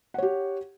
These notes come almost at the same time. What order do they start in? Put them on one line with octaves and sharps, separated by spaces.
F#5 C#5 G4